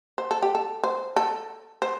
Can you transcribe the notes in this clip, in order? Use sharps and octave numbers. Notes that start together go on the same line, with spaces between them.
C5
A4
G4
A4
C5
A4
C5